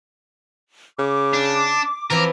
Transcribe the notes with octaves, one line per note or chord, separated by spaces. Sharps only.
C#3 D6
D4
E3 F3 C4 A#4